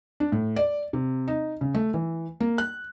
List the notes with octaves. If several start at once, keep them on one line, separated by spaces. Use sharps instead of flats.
D4
A2
D5
C3
D#4
C#3
A3
E3
A#3
F#6